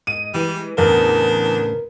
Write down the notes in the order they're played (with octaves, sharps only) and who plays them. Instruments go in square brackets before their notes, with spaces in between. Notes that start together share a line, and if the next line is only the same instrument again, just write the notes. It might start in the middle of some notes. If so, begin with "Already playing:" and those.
[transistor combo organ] G#2 D#5 [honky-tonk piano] D#7
[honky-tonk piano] E3 [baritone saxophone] G3 [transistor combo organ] G#3
[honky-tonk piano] E2 [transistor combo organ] A2 C#3 [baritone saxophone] D4 [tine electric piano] A#4